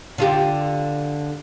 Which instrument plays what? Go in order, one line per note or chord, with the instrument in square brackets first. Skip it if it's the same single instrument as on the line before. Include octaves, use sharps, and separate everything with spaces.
[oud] D3 F4 G4